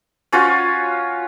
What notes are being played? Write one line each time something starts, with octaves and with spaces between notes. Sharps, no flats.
C#4 F4 F#4 C#5